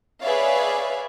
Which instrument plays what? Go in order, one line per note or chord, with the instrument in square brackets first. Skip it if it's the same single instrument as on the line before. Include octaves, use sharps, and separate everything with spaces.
[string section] G#4 B4 C#5 D5 E5 F5